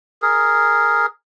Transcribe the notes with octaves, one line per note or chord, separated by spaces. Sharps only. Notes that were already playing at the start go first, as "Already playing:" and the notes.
G#4 A#4